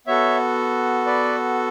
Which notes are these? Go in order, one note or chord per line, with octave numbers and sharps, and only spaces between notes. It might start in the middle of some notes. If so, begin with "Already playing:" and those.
B3 F#4 A4 C#5 E5
B4 D5